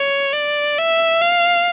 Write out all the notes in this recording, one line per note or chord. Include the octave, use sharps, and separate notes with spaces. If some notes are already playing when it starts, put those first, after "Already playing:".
Already playing: C#5
D5
E5
F5